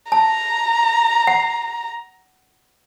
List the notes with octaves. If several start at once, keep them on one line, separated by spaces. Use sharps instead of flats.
A5 A#5
F#5